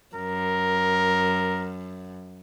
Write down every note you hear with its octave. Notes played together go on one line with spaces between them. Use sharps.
F#2 A#4